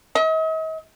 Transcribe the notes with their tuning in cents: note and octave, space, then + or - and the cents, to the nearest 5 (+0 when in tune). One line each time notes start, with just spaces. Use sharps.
D#5 +45